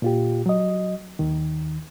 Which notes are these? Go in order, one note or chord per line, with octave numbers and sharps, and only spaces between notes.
A#2 F4 G4
F#3 D#5
D#2 D#3